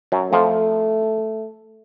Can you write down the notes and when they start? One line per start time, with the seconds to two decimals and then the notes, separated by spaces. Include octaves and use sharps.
0.12 F#2 F#3
0.32 F2 F3 A3